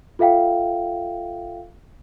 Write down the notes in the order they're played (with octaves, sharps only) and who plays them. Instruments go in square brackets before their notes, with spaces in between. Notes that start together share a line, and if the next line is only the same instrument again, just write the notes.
[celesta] F4 A4 E5 F5 G5